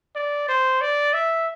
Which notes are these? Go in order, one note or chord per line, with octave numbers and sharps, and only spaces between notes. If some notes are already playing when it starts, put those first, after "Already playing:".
D5
C5
D5
E5